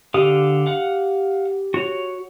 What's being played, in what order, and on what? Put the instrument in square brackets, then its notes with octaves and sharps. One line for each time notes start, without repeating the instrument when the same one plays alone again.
[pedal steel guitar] D3 F5 D#6 [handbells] G4
[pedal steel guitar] F5 F#5
F#4 C#5